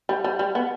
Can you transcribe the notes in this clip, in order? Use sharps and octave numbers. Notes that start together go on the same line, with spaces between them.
G3
G3
G3
B3